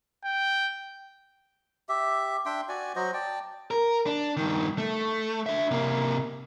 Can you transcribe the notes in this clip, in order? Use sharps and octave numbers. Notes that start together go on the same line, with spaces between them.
G5
G4 E5
D4 E5 G5 C6
F#4 D5 G#5
F#3 F#4 C5 D#5
D5 G5 A5
A#4
D4
G2 D#3
A3
D4 E5
C3 A#3